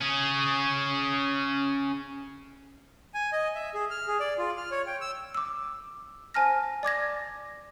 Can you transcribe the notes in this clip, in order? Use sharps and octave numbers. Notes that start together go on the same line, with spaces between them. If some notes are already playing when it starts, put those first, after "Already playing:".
C#4 G#4
G#5
D#5
E5
G#4
F6
G#4
D5
F4
F6
C#5
G5
E6
D6 E6
C5 G#5 A5 F6 A#6
D5 D6 G#6 A#6